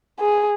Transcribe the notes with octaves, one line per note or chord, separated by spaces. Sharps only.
G#4